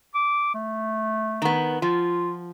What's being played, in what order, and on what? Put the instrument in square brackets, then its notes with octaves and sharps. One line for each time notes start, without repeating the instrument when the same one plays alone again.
[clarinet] D6
A3
[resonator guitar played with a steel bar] D#3 B3
[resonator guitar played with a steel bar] F3 [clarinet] F4